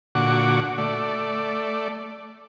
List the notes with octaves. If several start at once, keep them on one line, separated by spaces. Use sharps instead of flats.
A#2 D3 F#4 F#5 C#6 D6
A3 D5